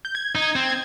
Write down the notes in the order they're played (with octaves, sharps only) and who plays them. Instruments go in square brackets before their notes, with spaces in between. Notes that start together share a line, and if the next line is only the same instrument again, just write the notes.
[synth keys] G6
G#6
[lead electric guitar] D#4
[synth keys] G#6
[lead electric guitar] C4
[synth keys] G#6